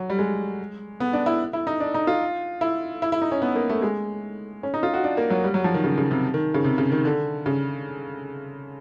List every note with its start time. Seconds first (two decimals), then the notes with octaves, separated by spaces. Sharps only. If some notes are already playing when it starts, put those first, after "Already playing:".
Already playing: F#3
0.10 G3
0.19 G#3
1.00 B3
1.13 D4
1.26 E4
1.53 E4
1.67 D#4
1.80 D4
1.94 D#4
2.07 F4
2.61 E4
3.02 E4
3.12 E4
3.22 D#4
3.32 C#4
3.42 B3
3.56 A#3
3.69 A3
3.82 G#3
4.63 C#4
4.74 D#4
4.83 F4
4.94 F#4
5.04 D4
5.17 A#3
5.30 F#3
5.44 G3
5.54 F#3
5.64 F3
5.74 D#3
5.84 C#3
5.98 C#3
6.11 C3
6.34 D#3
6.54 C#3
6.64 C3
6.78 C#3
6.92 D#3
7.05 D3
7.46 C#3